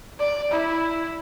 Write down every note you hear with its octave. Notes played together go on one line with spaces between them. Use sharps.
D5
E4